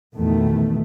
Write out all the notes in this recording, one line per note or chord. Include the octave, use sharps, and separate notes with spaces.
A#1 E2 B2 D#3 A3